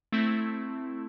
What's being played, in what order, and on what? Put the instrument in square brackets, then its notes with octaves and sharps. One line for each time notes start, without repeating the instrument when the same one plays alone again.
[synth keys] A3 C4 E4